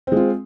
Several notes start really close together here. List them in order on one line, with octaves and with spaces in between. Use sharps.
C4 G#3 F4